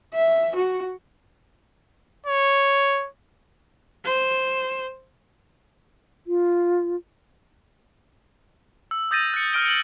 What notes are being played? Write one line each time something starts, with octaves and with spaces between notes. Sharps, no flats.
E5
F#4
C#5
C5
F4
E6
D#6 G6 A6 A#6 D#7
F#6 C#7
D#6 F6 D7 G7
D7 F#7